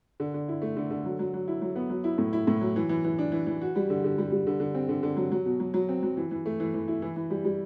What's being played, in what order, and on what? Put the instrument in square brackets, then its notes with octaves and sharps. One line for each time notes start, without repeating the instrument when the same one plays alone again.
[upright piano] D3
D3
E4
A3
D3
D3
F#3
F#3
F#3
E4
F#3
B3
F#3
E4
A2
E4
A2
F#3
E3
E3
E3
D4
E3
E3
F#4
G3
D3
D3
G3
G3
D3
D3
C4
D3
D3
F#3
F#3
B2
F#3
F#3
C4
F#3
E3
E3
A3
E3
E3
E4
E3
E3
G3
G3